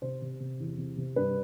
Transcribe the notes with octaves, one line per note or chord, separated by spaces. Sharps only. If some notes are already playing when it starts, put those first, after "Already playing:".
C3 C5
C3
C3
E2
C3
C3
G2 B4